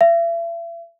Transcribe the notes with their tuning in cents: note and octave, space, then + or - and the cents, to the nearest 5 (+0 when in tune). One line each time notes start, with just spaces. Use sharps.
E5 +40